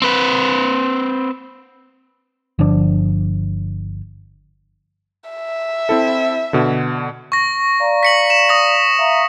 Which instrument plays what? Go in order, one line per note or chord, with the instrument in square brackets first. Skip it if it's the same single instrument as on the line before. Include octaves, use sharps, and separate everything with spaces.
[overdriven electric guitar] C4 B4
[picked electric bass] G1 D3 F3 D4
[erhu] E5
[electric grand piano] C4 E4 A4
B2 D3
[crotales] C#6 A#6
[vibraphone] D5 F5 A#5
[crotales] B6 C#7 F#7
E7
C#6 D#6 A#6
[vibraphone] E5 F5 A#5